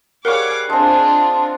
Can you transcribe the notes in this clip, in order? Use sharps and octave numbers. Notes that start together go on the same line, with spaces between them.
G3 G#4 A#4 C#5 F5 F#5 C#6 D6
G#3 C4 D4 F4 G#4 A5